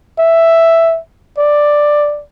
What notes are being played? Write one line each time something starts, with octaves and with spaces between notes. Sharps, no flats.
E5
D5